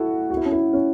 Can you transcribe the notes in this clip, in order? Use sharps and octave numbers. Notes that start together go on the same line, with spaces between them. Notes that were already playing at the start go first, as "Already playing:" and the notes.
Already playing: E4 F#4 A4
F#4
E4
C#4
E4
C#4